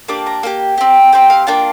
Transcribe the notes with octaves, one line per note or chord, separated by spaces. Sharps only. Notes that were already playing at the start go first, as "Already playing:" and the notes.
A#3 D4 G4 D6
A#5
A#3 D4 G4
C4 G4
C4 G4 G5
F5
A#3 D4 F4 G5